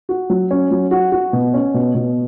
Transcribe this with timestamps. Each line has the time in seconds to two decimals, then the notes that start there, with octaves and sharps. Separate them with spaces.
0.09 F#4
0.30 F#3
0.51 C#4
0.71 F#3
0.91 F#4
1.12 F#4
1.33 B2
1.54 C#4
1.74 B2
1.95 B2